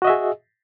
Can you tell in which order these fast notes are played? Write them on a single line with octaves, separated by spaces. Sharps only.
F#4 D#5 E5 G#4